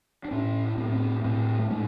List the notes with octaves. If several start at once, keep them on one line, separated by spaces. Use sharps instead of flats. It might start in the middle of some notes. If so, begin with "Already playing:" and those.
D4
A2 C#4
A2 C4
B3
C4
A2 C4
A3
A2 G#3